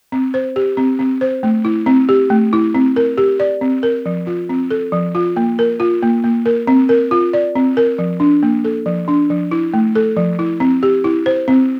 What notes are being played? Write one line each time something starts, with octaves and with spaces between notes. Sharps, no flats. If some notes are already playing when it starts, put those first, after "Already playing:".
C4
C5
G4
C4
C4
C5
A3
E4
C4
G4
A3
E4
C4
A#4
G4
D5
C4
A#4
F3
F4
C4
A4
F3
F4
A#3
A#4
F4
A#3
A#3
A#4
C4
A#4
F4
D5
C4
A#4
F3
D4
A#3
A4
F3
D4
F3
E4
A3
A4
F3
E4
C4
G4
E4
C5
C4